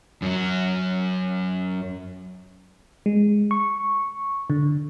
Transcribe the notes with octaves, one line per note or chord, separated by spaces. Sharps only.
F#2 F#3
G#3
C#6
D3